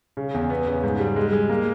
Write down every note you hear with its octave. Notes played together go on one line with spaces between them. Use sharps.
C#3
E2
B3
C#3
G#2
G3
G#3
G#3
A#3